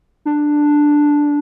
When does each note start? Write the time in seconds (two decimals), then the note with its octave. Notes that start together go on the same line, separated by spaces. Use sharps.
0.25 D4